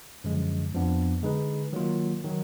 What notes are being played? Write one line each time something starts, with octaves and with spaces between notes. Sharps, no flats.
F#2 D3 F3 G#3
F2 F3 B3 D4
D3 G#3 D#4 G#4 B4
D#3 F#3 A#3 F4
D#3 F#3